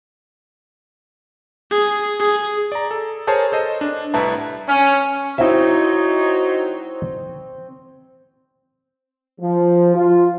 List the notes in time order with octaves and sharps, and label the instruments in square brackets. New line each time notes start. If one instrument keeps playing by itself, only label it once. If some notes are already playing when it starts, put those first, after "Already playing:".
[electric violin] G#4
G#4
[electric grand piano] D5 A#5
A4
G#4 A#4 C5 C#5 A5 A#5
A4 C5 D#5
D4
C2 A2 B4 E5 A5 A#5
[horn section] C#4
[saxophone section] F#3 D#4 [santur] C4 [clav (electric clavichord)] E4 E5
[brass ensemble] F3
F4